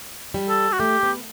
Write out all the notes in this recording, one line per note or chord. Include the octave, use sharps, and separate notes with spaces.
G3
A4
F#4
A3 G4
B3